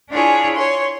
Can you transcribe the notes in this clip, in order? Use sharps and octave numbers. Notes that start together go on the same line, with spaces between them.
D4 E4 F4 G#4 C#5
C#5 C6